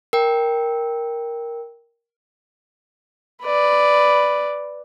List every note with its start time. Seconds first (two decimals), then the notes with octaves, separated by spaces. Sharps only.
0.13 A#4 G5
3.43 B4 D5